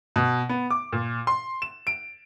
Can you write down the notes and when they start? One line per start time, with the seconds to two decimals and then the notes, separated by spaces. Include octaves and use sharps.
0.16 B2
0.49 B3
0.70 D6
0.93 A#2
1.27 C6
1.62 E7
1.87 D7